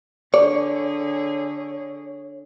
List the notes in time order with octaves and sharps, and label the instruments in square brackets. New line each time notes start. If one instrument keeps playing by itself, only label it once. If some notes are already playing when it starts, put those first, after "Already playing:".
[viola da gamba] D3 G#4 [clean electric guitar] C#5 [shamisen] D5